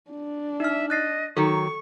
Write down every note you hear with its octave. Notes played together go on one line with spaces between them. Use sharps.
D4
D#4 E5 F6
D#5 F#6 A6 C7
D#3 F#3 A4 C#6